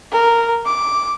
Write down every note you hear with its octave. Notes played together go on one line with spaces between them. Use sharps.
A#4
D6